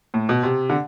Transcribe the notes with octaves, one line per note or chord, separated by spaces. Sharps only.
A2
B2
C3
D3